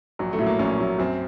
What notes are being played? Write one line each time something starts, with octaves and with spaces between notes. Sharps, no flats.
A#1 F#3
A3
A2 F#3
A#3
A#1 C#4
A2 F#3
F#2 C4